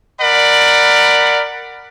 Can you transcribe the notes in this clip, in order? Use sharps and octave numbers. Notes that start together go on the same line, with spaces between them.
A#4 D5 F#5 B5